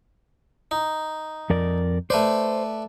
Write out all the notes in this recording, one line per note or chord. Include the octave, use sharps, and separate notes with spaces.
D#4
F2 A#4 D5
A3 B4 C5 D5